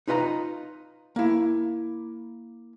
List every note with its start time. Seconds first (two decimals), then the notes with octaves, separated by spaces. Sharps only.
0.08 D#4 F4 B4 D#5 A#5
1.16 A#3 E4